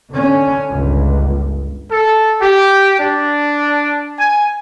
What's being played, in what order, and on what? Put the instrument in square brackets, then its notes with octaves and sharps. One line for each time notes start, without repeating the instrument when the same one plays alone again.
[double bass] D3 C#4
G1 C#2
[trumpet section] A4
G4
D4
G#5